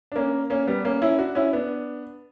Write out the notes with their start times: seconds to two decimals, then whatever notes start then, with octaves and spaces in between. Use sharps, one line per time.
0.12 D4
0.16 A#3 C#4
0.50 A#3 C#4
0.67 G3 B3
0.85 A#3 C#4
1.02 C#4 E4
1.18 D4 F#4
1.35 C#4 E4
1.53 B3 D4